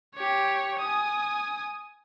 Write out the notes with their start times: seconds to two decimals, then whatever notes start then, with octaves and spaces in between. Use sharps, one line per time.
0.15 G4 C#5
0.79 G#5 D#6